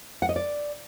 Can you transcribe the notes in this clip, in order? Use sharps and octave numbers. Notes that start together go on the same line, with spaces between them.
F#5
D#5
D5